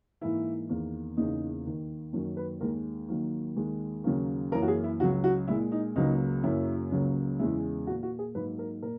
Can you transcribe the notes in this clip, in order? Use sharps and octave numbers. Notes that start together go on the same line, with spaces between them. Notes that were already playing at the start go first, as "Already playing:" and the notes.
G#2 E3 A#3 E4
E2 D#3 A#3
E2 C#3 E3 A#3 D#4
D#2 D#3 A#3
F#2 D#3 F#3 A#3 C#4
B4
D#2 D#3 G#3 A#4
D#2 D#3 F#3 A#3
D#2 D#3 G#3
D#2 C#3 F#3 A#3
F#2 E3 A#3 A#4
F#4
G#4
E4
C#2 C#3 F#3 F#4
F#4
A#2 G#3 E4
D#4
C#2 C#3 F#3 A#3 D#4
F#2 C#3 F#3 A#3 E4
C#2 C#3 F#3 A#3
E2 C#3 E3 G#3 E4
A#2 A#3 F#4
F#4
G#4
G#2 F#3 A#3 B4
A#4
A#2 A#4